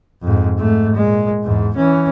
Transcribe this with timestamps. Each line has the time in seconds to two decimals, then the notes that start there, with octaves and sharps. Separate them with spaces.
0.23 F2 G#2
0.58 G#2 A3
0.95 A#2 G#3
1.44 E2 G#2
1.76 E3 C#4